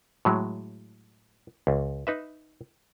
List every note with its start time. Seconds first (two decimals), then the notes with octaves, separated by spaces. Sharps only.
0.25 A2 F#3 G#3
1.67 C#2
2.07 D#4 B4 E5